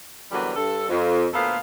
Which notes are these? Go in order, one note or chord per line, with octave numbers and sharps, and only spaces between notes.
D3 E3 F#3 G3 A#3 B3
G2 A4
F2
D2 A#2 B3 A4 C5 F5